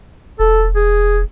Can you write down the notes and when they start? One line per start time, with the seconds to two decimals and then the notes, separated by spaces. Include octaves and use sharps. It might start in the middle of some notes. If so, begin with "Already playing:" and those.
0.40 E1 A4
0.76 G#4